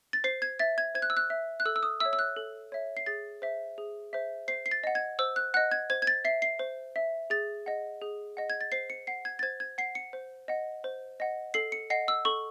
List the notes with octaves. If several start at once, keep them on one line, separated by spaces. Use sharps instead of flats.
A6
C5 C7
G#6
E5 A6
G#6
C5 G#6
F#6
E6
F#6
E5
F#6
A4 E6
E6
D#6
C#5 E5 E6
E6
F#6
A4
C#5 E5
C7
G#4 A6
C5 E5
G#4
C5 E5
C5 C7
C7
A6
D#5 F#5
G#6
C5 E6
F#6
D#5 F#5 F#6
G#6
C5 G#6
G#6
A6
E5 C7
C7
C5
E5
G#4 A6
D#5 F#5
G#4
D#5 F#5
G#6
A6
C5 C7
C#7
F#5 C7
G#6
A6
C5 G#6
G#6
F#5 C7
C#7
C5
D#5 F#5
C5
D#5 F#5
A4 C7
C#7
D#5 F#5 C7
E6
A4 C#6